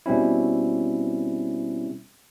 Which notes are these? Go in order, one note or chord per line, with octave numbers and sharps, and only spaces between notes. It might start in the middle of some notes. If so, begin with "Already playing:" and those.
B2 G3 C4 C#4 E4